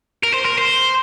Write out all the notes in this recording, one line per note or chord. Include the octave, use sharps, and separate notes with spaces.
A#4
C5
A#4
C5